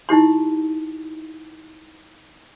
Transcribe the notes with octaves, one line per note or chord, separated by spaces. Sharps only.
D#4 E4 G4 C6